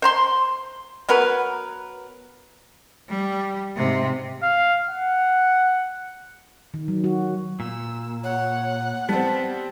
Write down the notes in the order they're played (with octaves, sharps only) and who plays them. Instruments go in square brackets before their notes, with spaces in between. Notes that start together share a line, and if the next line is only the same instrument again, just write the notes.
[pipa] C5 A#5 C6
F#3 B3 A#4 B4
[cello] G3
G#2 C3
[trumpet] F5
F#5
[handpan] D#3
F#3
F#4
[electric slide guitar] A#2 [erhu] E6
[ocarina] C#5 [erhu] F#5
[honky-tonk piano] G3 C4 [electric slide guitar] B3 [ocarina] A5